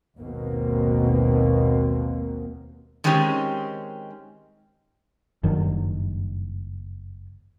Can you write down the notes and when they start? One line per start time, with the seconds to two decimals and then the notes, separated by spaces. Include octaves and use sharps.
0.20 G#1 D#2 B2 A#3 C4
3.04 D#3 G#3 C4 C#4 G4
5.43 F#1 G2 D#3 F#3